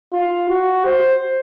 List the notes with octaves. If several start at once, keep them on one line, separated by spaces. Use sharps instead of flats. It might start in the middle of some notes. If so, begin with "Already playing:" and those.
F4
F#4
C5